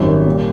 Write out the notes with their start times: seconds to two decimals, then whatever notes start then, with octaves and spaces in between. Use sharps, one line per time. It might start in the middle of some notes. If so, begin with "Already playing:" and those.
Already playing: G#1 F#2 D#3 G3
0.26 A#2 G3